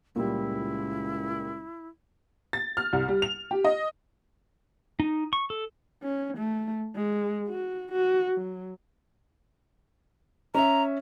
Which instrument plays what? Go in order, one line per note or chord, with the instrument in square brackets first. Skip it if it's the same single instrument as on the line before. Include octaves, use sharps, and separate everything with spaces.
[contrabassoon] C#2 [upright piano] A#2 G3 [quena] E4
[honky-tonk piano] A6
F6
C2
G3
F7
G4
D#5
[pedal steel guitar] D#4
C#6
A4
[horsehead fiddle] C#4
A3
G#3
F#4
F#4
F#3
[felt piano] C#4 E5 [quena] A#5